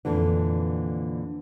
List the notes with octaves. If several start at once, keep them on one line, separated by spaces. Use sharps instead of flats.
F2 A#2 D3 E3